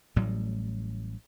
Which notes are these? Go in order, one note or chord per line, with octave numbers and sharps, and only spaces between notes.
A1 A2 F#3 G3